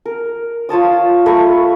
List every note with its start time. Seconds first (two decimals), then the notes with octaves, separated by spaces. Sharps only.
0.05 A#4
0.69 F4 C#5 A5 D#6
1.26 A3 B4 A#5 C#6